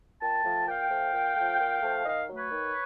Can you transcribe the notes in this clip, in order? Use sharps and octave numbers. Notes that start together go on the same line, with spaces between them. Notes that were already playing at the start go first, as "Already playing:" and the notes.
A#2 G5 A5
F3 A3
A#2 F5 G5
F3 A3
A#2
F3 A3
A#2
F3 A3
D#3 D#5 F5
F#3 A3
B4 C#5
D#3